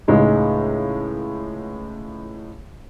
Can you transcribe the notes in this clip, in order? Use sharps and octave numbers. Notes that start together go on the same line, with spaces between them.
C#2 A2 G#3 D#4